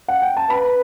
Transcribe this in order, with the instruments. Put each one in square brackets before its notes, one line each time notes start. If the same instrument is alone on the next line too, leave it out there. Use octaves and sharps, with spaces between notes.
[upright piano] F#5
G5
A5
[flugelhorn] B4 [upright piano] B5